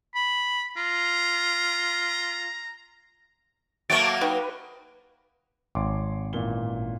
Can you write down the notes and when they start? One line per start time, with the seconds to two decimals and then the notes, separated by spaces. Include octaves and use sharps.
0.15 B5
0.77 F4 A#5
3.90 F#3 A3 A#3 C#5 A5 D6
4.21 D#4 F#4 G4 B4
5.75 G#1 C#5 C6 D6
6.33 A1 A#2 G7